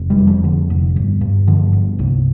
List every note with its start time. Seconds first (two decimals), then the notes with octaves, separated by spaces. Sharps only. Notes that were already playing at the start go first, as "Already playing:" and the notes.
Already playing: F1
0.10 G3
0.18 F2
0.27 F3
0.44 D3
0.70 F1
0.96 G1
1.21 G2
1.47 D3 F3
1.73 G1
1.99 C2